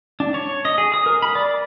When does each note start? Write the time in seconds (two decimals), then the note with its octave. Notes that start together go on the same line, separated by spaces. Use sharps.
0.20 D4
0.34 C#5
0.65 D#5
0.78 G#4
0.94 D#6
1.06 A#4
1.22 B5
1.35 D5